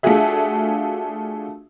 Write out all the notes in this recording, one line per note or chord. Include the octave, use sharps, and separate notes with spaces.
A3 D4 F4 F#4 G#4 E5